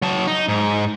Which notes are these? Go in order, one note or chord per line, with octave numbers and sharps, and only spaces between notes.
F#3 A5
D#4
G#2